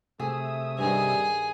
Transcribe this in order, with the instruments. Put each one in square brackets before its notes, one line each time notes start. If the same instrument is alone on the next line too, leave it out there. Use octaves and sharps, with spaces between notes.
[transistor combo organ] C3 E5 D#6 [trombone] A3 [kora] G#4
[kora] G2 D#3 [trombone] G3 [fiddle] G#4